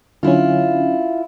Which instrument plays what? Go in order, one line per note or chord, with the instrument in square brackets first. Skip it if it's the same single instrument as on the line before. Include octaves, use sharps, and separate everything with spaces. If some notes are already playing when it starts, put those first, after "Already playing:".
[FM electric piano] D3 F#3 C#4 [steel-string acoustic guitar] E4 F4